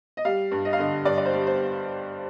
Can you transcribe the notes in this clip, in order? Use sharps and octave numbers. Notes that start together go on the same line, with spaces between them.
D#5
G3 F5
G2
D#5
F5
D3 D#5
G2 D5
D5
C5
G3
C5